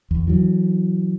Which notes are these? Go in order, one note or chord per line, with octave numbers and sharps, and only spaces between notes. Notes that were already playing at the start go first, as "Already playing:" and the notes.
E2
E3 F#3